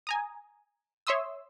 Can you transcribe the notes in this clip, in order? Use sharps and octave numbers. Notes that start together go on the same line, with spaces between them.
G#5 A#5 D#6
C#5 E5 C6 D#6 E6